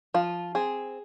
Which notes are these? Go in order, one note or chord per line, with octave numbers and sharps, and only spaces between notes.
F3 F4
C4 G#4